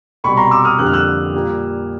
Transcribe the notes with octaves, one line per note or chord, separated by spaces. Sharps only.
C2 B2 G3 B5 C#6
A#5 C6
D6 E6
D#6 F6
F2 D3 G3 A#3 F#6
F6
E6 F#6
A#2 G3 A#3